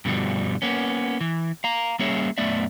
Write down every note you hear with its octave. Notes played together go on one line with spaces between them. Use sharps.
G2 B2 D3 F3 G3
A#3 B3 C#4
E3
F5 A#5
G3 A#3 C#4 G#4 C#5 E5
F#2 A3 B3 D5 E5